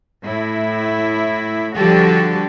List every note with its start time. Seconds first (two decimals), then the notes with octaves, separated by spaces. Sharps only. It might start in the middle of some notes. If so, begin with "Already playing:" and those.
0.24 A2 E4
1.76 D3 F3 G3 F#4 G4 A4